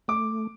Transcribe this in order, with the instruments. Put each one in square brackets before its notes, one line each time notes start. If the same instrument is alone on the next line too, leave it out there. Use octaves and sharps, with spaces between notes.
[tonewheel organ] A3 [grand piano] D6